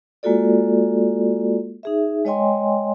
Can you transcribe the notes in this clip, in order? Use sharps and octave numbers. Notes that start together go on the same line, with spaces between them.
G#3 A#3 F4 F#4 A4 D5
D#4 G#4 E5
G#3 C#5 D#5 G5 G#5 C6